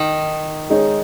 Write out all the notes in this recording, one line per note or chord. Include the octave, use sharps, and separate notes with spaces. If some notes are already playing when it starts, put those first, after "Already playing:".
Already playing: D#3
G#3 D#4 G#4 C#5